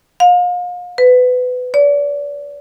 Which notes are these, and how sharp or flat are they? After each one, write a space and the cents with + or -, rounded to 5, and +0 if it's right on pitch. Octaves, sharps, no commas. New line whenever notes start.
F5 +35
B4 +25
D5 -35